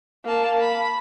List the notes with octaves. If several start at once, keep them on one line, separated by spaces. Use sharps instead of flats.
A#3 A5
B5